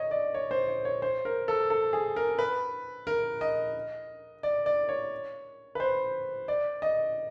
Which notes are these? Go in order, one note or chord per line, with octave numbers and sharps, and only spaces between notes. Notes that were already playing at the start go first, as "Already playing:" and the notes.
Already playing: C#5 D#5
D5
C#5
C5
C#5
C#5
C5
A#4
A4
A4
G#4
A#4
B4
A#4
D#5
D5
D5
C#5
B4
C5
D5
D#5